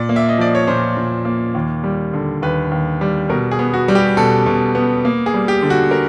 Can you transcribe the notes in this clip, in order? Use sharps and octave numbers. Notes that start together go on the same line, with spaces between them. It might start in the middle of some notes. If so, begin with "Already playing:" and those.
Already playing: A#2 D5
A#3
E5
D#5
F3 D5
C#5
A#2 C5
A#2
A#3
D#2
G3
D3
D#2 B4
D#2
G3
B2 A#4
G#4
B3
F#4
G3
G4
B2 A4
B2
B3
A#3
G#4
G3
G4
D3
F#4
A#4